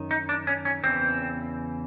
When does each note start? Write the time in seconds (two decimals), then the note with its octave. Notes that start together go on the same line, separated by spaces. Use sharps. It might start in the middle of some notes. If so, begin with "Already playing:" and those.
Already playing: F#2 D#3
0.11 D#4
0.29 D4
0.47 C#4
0.65 C#4
0.84 E2 C#3 E3 C4